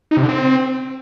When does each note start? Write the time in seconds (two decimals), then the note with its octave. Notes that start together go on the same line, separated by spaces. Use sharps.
0.11 D#4
0.17 C3
0.23 D3
0.29 C4